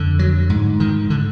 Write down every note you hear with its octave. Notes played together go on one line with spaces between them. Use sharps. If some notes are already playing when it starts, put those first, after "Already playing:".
Already playing: F2 D3
F#3
G#2
D#3
D3